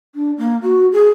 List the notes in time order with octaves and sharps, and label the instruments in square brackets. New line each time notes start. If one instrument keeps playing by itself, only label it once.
[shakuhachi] D4
A#3
F#4
G#4